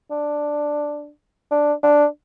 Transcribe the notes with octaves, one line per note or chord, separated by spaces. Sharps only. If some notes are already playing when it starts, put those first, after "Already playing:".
D4
D4
D4